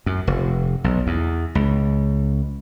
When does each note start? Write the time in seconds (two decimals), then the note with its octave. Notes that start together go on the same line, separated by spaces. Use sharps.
0.06 F#2
0.27 F1
0.84 B1
1.07 E2
1.55 C#2